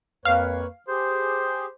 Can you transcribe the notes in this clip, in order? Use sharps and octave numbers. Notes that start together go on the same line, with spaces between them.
F2 A#3 B4 C#5 F5
G4 G#4 C5